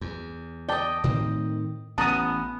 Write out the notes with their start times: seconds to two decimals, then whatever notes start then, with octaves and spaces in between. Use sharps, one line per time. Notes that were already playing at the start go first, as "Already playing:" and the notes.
0.01 E2
0.69 D5 D#5 G5 A5
1.04 A2 D#3 C4
1.98 A1 B3 C#4 A5 A#5 D#6